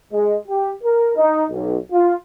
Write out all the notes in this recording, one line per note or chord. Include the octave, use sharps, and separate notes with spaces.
G#3
G4
A#4
D#4
B1
F4